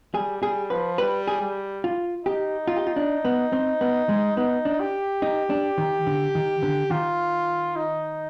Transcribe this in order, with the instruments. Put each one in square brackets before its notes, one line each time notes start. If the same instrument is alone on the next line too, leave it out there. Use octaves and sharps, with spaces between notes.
[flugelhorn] G3 [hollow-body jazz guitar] G#4
[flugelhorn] G3 [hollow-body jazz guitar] G#4
[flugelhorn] F3 [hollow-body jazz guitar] B4
[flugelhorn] G3 [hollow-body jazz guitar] B4
[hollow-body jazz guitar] G#4
[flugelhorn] G3
[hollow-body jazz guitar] F4
[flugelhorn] D#4 [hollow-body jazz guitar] G4
[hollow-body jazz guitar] F4
G4
F4
D4
B3
C4
B3
G#3
[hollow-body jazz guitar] B3 [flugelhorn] D#4
[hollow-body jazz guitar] D4
[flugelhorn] G4
[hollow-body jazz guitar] D#4
D4
D#3
D3
D#3
D3
[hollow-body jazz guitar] D#3 [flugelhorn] F4
[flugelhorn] D#4